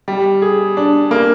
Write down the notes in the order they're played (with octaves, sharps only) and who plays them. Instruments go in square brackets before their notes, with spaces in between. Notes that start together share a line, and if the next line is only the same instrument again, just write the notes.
[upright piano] G3
G#4
D4
A#3